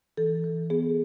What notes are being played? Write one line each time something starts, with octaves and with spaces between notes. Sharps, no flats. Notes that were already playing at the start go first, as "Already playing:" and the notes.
E3 A4
E3
B3 G#4